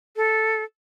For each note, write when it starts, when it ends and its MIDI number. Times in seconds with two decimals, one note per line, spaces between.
0.16 0.64 69